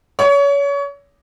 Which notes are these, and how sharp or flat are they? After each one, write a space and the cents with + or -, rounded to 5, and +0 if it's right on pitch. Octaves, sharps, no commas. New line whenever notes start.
C#5 +30